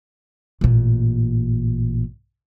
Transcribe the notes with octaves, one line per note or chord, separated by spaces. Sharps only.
A1 A#2